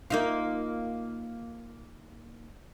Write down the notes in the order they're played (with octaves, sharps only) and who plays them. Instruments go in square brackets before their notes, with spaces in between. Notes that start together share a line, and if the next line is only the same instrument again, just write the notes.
[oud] A#3 D#4 F4